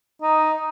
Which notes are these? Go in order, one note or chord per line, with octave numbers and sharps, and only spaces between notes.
D#4